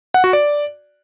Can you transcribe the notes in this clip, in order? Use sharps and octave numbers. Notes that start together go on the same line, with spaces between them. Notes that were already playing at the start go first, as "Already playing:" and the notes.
F#5
F#4
D5